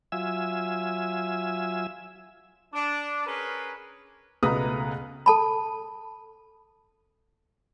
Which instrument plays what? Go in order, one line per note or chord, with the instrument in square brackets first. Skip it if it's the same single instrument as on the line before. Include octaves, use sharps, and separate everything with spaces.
[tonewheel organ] F#3 F4 E5 G#5 E6
[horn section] D4
C#4 G#4 A#4 B4
[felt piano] C#2 B2 A3 B4 A#5 D#6
[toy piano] A4 A5 B5